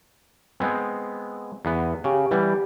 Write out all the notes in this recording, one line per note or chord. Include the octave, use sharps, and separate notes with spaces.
G#3 B3 C4
E2 B3
C#3 G4
E3 G3 B3